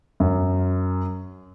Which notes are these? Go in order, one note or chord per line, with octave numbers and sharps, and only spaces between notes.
F#2